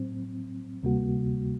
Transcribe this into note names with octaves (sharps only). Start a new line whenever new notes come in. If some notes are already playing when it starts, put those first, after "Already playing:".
Already playing: A2 F#3 C4
D2 C3 G3 A#3 F#4